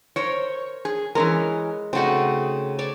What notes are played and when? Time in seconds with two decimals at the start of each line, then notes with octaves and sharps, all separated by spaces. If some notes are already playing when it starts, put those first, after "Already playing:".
0.16 A#4 C5 C#5
0.85 G#4
1.15 E3 G#3 C#4 A#4
1.93 C#3 A3 C4 D#4 F#4
2.79 C#5 D5 A5